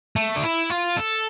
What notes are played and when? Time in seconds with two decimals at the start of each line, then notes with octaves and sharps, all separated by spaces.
0.16 A3
0.36 D4
0.43 E4
0.70 F4
0.97 A4